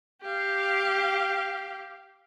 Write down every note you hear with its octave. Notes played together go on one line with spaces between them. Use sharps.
G4 F5